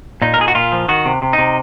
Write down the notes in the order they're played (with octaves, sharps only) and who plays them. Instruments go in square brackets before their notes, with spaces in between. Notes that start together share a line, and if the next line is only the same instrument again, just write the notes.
[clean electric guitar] A#2 D#4
A#4
A#2 G#4
F#4
A#2 F4
F3
D#3 F#4
C3
C3
D#4
C3